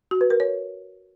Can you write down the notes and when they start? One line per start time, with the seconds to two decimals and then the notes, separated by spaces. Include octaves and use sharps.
0.11 F#4
0.21 B4
0.30 A#4
0.40 C#5